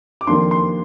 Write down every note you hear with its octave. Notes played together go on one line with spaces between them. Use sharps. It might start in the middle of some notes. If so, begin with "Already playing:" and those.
D6
F2 D#3 A#3 D4 C6
C6